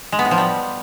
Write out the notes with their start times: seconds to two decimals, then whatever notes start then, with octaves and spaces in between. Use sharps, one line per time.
0.12 G#3
0.19 B3
0.25 A2
0.31 F3
0.38 G3